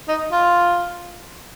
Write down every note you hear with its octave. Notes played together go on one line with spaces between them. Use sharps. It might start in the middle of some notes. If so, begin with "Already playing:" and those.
D#4
F4